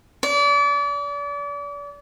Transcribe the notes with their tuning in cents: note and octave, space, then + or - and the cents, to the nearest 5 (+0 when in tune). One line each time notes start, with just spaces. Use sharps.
D5 -35